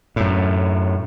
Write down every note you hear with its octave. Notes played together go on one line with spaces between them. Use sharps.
F#2 A2